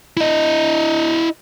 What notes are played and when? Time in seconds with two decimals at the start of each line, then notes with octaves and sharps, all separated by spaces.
0.17 E4 D#5